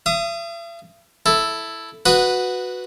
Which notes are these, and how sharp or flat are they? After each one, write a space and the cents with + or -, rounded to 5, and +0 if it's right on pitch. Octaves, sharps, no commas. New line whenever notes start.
E5 +45 D#6 +0
E4 +0 A4 +0
F#4 -10 B4 +0 D#6 -5